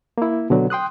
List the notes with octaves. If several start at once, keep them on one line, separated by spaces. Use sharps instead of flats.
A#3 E4
B2 D3 F#3
G5 C6 D#6 F#6